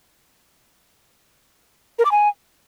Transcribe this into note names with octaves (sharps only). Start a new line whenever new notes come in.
A#4
D6
G#5